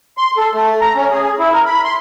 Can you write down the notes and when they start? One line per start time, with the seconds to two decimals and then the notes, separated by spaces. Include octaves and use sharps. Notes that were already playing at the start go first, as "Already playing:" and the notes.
0.17 C6
0.37 A4
0.54 A3
0.81 A#5
0.95 C#4
1.10 G#4
1.39 E4
1.53 A#4
1.66 B5
1.84 C6